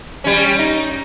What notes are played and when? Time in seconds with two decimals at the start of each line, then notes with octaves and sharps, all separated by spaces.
0.24 G3 C#4
0.59 D#4